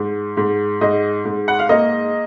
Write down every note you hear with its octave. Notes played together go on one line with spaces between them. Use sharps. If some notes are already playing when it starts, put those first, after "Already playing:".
Already playing: G#2
G#2
G#2 D#5
G#2
F#5
F5
A#3 D#5